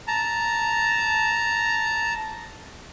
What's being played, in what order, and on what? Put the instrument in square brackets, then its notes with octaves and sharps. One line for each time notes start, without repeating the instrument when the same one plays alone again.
[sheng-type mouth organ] A5 A#5